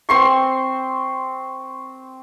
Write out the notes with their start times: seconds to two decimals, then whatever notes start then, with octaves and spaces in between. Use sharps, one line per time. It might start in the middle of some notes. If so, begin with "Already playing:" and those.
0.09 C4 C6 C#6